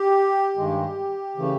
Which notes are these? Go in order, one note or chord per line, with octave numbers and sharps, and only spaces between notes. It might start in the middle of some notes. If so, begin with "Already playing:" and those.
Already playing: G4
G2 D#3 G#3
C#3 E3 A3